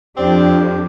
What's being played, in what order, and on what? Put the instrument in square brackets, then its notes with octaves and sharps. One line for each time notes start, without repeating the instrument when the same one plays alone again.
[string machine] F2 [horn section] C4 D5 [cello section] D4 [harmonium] G4